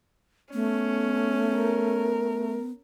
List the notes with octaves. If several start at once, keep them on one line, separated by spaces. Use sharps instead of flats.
A3 B3 C#4
A#4